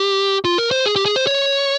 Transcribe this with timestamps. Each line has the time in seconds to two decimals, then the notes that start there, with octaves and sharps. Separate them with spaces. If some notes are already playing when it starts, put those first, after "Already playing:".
Already playing: G4
0.45 F4
0.58 A#4
0.71 C5
0.86 G#4
0.96 G4
1.05 G#4
1.16 C5
1.27 C#5